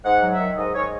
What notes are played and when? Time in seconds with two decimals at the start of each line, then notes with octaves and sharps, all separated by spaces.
0.05 G#2 F#5
0.23 F#3
0.32 E5
0.39 D#3
0.57 G#2 D#5
0.75 G#2 C#5